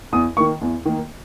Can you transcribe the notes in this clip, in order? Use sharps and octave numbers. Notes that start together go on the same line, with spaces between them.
E2 D#6
D#3 A#3 C#6
E2
D#3 A#3